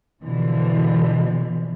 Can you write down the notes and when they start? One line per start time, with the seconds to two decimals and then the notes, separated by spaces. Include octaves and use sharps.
0.21 B2 D3 E3 F3